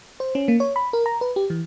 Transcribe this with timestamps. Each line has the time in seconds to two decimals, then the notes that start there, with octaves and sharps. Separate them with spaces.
0.20 C5
0.35 C#4
0.48 A#3
0.60 C#5
0.76 B5
0.93 A#4
1.06 A#5
1.21 B4
1.36 G4
1.50 E3